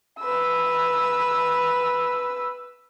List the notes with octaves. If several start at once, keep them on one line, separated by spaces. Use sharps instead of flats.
B4 E6